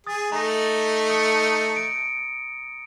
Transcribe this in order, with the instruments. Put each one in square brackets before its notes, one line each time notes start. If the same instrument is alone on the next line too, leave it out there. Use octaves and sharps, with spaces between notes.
[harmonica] G#4 [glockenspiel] D#6 A6
[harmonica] A3 D#4 [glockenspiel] A#5 A#6
[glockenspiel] A#5 D#6 C#7
D7